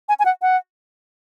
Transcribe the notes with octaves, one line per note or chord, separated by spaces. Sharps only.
G#5
G#5
F#5
F#5